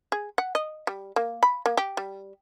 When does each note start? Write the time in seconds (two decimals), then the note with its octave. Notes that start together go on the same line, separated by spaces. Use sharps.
0.12 G#4
0.38 F#5
0.55 D#5
0.87 G3
1.16 A#3
1.43 B5
1.66 A#3
1.77 G4
1.97 G3